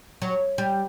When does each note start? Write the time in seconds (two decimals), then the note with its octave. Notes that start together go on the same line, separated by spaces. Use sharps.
0.22 F#3
0.58 G3